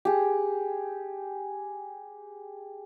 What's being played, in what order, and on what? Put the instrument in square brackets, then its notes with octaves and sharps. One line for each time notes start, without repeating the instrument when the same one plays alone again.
[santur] G4 G#4